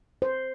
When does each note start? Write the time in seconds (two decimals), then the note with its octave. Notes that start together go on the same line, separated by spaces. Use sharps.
0.22 C5